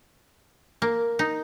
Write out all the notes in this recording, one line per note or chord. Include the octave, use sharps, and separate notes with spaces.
A#3
D#4